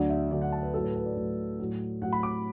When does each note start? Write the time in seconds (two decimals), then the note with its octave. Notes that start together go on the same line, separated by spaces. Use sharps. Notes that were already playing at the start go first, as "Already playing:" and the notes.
Already playing: D2 D3 F#3 D5
0.10 E5
0.31 D2 D3 F#3 D5
0.42 F#5
0.52 A5
0.63 B4
0.74 A2 F#3 A4
0.84 B4
0.95 B4
1.05 D5
1.17 A2 F#3
1.60 A2 F#3
2.02 A2 F#3 F#5
2.13 B5
2.23 D6